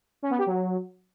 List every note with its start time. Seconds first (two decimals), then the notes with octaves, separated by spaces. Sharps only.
0.23 C#4
0.30 B3
0.38 G4
0.46 F#3